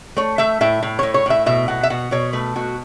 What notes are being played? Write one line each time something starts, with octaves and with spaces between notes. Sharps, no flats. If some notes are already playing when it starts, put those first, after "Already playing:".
A3 C#5
A3 E5
A2 E5
A2
A2 C#5
C#5
A2 E5
B2 E5
B2 F#5
E5
B2 F#5
B2 C#5
A3 B4
B2 F#4